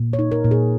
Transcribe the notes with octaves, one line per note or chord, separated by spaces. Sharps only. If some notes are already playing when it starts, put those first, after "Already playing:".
Already playing: A#2
C#5
D#4
A#4
A#2
G#4